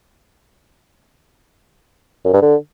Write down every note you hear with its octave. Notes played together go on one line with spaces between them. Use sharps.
F#2
G2
D3